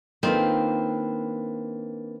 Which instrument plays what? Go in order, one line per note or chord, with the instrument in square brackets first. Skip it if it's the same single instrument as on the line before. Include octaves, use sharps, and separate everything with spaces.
[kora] D#3 F4 C5 [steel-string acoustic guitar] A#3 D4 B4 [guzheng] C4